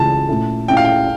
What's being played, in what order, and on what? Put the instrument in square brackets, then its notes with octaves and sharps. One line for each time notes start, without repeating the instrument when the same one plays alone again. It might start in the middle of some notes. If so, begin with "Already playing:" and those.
Already playing: [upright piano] C#2 C#3 E3 [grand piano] A5
[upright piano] A#2 A3 C#4 E4
[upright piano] A#2 A3 C#4 E4 [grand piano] G5
[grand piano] F5
G5